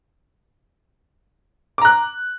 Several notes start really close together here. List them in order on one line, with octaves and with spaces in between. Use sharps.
D6 A#5 F#6